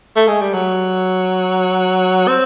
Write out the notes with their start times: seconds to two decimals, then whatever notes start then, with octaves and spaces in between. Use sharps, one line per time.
0.16 A3
0.28 G#3
0.41 G3
0.54 F#3
2.28 C4